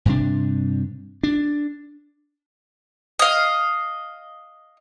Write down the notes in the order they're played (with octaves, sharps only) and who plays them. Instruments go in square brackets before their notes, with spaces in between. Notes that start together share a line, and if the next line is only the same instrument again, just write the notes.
[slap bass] G2 C3 D4
D4
[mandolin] D#5 F5